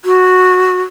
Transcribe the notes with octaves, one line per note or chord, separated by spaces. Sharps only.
F#4